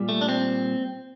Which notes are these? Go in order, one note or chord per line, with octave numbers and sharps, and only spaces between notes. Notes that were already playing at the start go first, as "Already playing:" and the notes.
Already playing: A#2 G3
A3
D4
C4